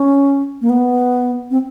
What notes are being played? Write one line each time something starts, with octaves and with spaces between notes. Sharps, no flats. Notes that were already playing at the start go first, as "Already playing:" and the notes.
Already playing: C#4
A#3
B3
C4